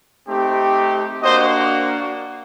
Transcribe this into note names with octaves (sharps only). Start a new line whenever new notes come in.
A3 C4 D#4 G4
A#3 D4 F#4 C5 D#5